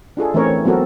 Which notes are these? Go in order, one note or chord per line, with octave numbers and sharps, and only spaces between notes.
D4 F4 G#4 A4
E3 A3 C4 C#4 A#4 C#5
F#3 B3 C4 F#4 A4 A#4